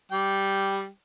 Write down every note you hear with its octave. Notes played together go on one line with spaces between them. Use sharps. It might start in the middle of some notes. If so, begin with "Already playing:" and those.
G3 G5